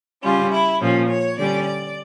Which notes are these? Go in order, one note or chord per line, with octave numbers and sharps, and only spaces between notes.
C#3 G3 C#4 F4
E4
A#2 F3 C#4
C#5
D3 G3 C#4 D5
D5